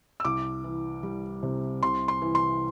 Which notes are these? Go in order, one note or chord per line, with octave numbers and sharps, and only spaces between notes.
E6
C2 D6
E3
G3
C3
C2 C6
C6
E3
C6